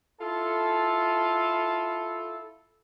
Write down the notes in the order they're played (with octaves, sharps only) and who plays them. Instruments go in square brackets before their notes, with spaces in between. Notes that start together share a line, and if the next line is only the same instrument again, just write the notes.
[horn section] E4 F4 A4